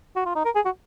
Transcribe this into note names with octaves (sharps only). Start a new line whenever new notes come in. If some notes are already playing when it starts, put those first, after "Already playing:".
F#4
F4
D#4
A#4
G#4
F#4